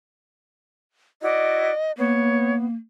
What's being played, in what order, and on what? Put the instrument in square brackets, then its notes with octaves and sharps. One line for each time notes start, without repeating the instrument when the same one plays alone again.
[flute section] E4 F#4 D5 [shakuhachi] D#5
[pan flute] A#3 [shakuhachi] B3 [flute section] C#5